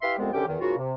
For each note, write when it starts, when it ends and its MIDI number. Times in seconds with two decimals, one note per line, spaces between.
0.02 0.15 64
0.02 0.15 67
0.02 0.15 71
0.02 0.15 76
0.02 0.15 77
0.02 0.15 84
0.19 0.33 36
0.19 0.33 41
0.19 0.33 48
0.19 0.33 56
0.19 0.33 59
0.19 0.33 60
0.33 0.45 36
0.33 0.45 42
0.33 0.45 50
0.33 0.45 61
0.33 0.45 67
0.33 0.45 79
0.48 0.57 40
0.48 0.57 51
0.61 0.74 44
0.61 0.74 49
0.61 0.74 58
0.61 0.74 65
0.61 0.74 66
0.78 0.95 48